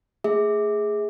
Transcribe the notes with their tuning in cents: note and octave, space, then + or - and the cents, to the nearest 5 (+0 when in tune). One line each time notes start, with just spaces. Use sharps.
A3 +40 G#4 +0 E5 -30